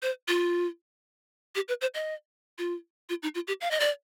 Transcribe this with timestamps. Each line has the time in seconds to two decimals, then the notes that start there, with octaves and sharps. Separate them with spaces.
0.03 C5
0.28 F4
1.55 G4
1.69 B4
1.81 C5
1.94 D#5
2.58 F4
3.09 F4
3.23 D#4
3.35 F4
3.48 G4
3.61 F5
3.71 D#5
3.80 D5